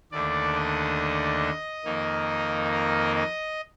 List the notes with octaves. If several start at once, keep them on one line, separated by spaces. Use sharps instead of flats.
D#2 D3 A3 D4 D5
D#5
F2 D#3 A#3 D#4
D#5
D#5